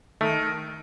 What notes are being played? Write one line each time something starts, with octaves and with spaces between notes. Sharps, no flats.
D#3 A3